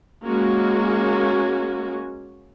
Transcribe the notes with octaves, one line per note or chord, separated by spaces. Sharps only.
G#3 A#3 C#4 F#4